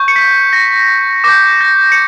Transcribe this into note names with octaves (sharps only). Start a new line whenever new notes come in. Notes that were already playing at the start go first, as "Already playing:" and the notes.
Already playing: C#6 G6
C#7
B6
A#6
D6 G6 A#6
A#6
C#7